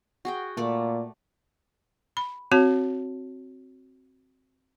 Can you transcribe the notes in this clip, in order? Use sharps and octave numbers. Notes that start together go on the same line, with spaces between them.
F#4 G#4 G5
A#2 A3 D5
B5
C4 F#4 C#5 A5